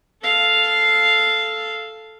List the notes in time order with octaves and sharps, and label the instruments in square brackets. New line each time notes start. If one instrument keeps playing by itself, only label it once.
[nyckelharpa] A4 F5